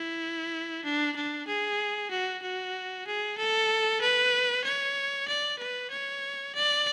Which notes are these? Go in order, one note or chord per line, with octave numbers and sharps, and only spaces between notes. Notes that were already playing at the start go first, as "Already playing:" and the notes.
Already playing: E4
D4
D4
G#4
F#4
F#4
G#4
A4
B4
C#5
D5
B4
C#5
D5